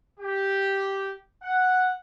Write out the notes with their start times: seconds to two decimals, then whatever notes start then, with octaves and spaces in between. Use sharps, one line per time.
0.20 G4
1.42 F#5